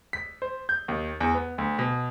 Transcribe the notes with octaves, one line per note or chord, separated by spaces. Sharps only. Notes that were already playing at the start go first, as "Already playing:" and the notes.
B6
C5
G6
D#2
E2
B3
D2
B2